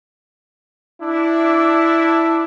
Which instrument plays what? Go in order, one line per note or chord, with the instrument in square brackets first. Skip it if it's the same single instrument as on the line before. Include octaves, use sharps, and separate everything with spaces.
[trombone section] D4 E4